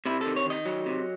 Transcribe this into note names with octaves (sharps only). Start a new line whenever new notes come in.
C3 E4
D#3 A4
C#5
D#3 D#5
F#3
C3